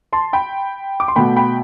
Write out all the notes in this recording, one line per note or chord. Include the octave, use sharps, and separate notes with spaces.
A5 C6
G5 B5
D6
C6
B2 A3 G5 B5
G5 B5